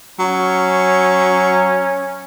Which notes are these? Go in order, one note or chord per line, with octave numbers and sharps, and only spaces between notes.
F#3 C#4